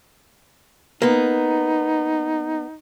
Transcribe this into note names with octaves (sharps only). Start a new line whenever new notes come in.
A#3 B3 D#4